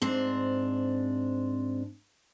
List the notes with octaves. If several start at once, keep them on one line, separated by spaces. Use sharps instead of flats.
G#2 C4 D4